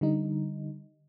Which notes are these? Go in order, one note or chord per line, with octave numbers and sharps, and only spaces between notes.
D3 G3 D#4